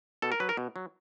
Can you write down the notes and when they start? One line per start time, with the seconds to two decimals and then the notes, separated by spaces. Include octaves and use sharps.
0.22 B2 A4
0.32 A#4
0.40 F#3 B4
0.49 A#4
0.57 B2
0.76 F#3